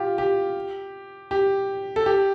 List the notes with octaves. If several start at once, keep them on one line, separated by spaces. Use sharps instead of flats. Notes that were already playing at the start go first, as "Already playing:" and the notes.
Already playing: F4 G4
G4
G4
A4
G4